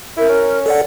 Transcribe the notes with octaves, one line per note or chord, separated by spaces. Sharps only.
E4 A#4
C#4
A4 D5 F#5